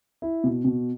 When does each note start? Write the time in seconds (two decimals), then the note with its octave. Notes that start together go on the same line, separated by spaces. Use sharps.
0.22 E4
0.44 B2
0.65 B2